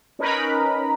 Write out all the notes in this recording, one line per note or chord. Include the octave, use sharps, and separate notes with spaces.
C#4 D#4 A#4 B4 A#5 B5